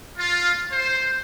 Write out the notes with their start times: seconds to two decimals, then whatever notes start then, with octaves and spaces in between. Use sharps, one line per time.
0.18 F4
0.72 C5